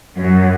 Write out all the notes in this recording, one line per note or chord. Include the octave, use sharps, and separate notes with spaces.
F#2